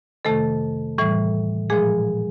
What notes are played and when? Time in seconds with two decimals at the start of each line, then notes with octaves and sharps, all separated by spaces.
0.25 F2 C3 D#3 A3 A4
0.98 A2 E3 G3
1.70 A#2 F3 G#3 G#4